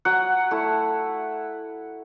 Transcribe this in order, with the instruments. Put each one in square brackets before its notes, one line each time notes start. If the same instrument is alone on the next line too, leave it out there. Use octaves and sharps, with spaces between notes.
[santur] F#3 F#5
A3 E4